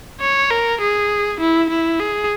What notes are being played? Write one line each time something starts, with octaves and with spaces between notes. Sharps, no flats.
C#5
A#4
G#4
E4
E4
G#4